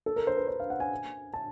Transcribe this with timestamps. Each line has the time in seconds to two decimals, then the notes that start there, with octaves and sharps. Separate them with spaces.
0.06 A4
0.16 A#4
0.27 C5
0.37 B4
0.48 C5
0.60 F5
0.70 F#5
0.80 G#5
1.34 A5